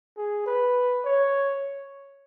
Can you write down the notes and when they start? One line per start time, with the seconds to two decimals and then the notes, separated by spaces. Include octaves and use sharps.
0.17 G#4
0.46 B4
1.04 C#5